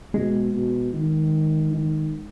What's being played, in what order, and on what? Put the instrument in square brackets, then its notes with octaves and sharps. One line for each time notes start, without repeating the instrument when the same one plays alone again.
[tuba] B2 [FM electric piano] G#3
[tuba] B2
D#3
D#3